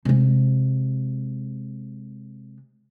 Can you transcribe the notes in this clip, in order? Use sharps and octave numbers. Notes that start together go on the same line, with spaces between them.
C3 G#3